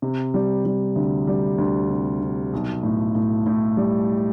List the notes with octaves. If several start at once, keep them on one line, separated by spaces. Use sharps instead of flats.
C3
G3
G3
D2
G3
D2
C3
C3
B1
A2
A2
A2
G3